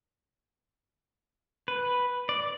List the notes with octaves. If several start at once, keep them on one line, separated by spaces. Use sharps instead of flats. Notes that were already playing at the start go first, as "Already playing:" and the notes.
B4
D5